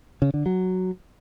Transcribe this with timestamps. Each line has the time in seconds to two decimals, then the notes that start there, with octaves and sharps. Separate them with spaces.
0.22 C#3
0.34 D3
0.46 F#3